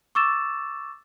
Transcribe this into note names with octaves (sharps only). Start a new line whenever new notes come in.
C#6 D6 E6 A6 E7